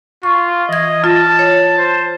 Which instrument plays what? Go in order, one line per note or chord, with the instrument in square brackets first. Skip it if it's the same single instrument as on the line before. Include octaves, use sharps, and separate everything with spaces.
[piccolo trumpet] F4 [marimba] C#6
[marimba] E3 G#6 [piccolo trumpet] D#5
[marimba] F4 [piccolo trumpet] A5
[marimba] C#5
[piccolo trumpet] C5